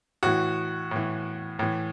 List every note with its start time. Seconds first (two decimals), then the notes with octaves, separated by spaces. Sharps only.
0.23 A2 E3 F#4
0.91 A2 E3
1.59 A2 E3